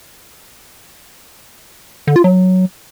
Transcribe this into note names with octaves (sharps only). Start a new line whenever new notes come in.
D3
F4
F#3